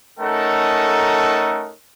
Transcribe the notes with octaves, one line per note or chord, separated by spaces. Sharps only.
A3 C#4 D#4 A4 A#4 F#5